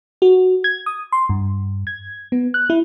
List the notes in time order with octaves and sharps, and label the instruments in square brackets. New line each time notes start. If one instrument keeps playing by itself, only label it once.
[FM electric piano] F#4
G#6
D#6
C6
G2
G#6
B3
F#6
E4